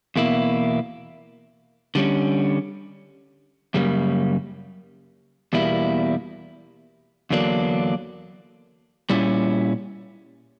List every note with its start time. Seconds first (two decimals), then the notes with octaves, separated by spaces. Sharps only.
0.16 E2 B2 A#3 E4
1.95 D3 G3 C#4
3.74 F#2 C#3 G3 A#3
5.53 E2 B2 G3 A#3 E4
7.30 E2 D3 F#3 A#3 D4
9.10 A#2 G3 C#4 E4